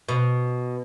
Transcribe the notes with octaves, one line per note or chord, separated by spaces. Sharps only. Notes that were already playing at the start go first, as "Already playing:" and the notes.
B2